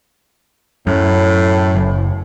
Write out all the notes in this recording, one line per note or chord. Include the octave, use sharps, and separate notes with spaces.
F#2 A2
F#1